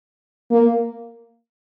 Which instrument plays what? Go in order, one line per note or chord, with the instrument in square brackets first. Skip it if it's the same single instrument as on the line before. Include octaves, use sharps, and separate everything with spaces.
[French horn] A#3